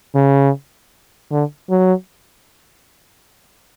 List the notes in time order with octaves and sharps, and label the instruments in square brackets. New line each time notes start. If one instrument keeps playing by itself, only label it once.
[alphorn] C#3
D3
F#3